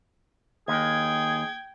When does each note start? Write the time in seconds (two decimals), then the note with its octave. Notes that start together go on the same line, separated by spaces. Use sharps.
0.68 D#2 G#4 G5 G#6